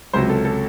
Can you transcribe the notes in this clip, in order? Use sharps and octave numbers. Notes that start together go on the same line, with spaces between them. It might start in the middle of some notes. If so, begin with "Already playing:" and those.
C#2 C3 F#3 C5
A4
A4